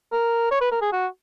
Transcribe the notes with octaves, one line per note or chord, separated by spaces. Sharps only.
A#4
C#5
B4
A#4
G#4
F#4